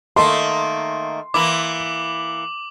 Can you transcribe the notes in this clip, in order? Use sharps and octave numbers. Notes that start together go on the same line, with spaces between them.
D#3 A3 A#3 C6
E3 A#3 E4 D6 F#7